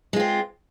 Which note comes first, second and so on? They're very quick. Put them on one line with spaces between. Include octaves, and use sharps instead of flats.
G#3 F4 C4